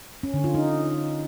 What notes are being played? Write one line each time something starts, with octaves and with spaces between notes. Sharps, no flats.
C#4
D3
F4
D#4